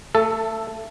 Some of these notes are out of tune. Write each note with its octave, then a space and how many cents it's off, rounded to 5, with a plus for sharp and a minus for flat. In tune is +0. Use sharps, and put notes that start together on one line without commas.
A3 +25 A4 +0